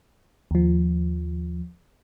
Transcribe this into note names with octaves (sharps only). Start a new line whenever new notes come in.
D#2 F3